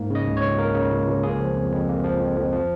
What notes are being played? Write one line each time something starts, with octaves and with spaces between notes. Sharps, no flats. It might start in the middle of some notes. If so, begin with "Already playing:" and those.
Already playing: G#2 A#3
C#3 D#5
C#2
C#5
C#2
A#3 A#4
C#3
C#2
C#2
A#3 G#4
F3
F2
F2
A#3
F3
F2
F2
F3